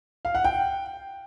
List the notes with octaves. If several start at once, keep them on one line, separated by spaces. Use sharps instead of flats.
F5
F#5
G5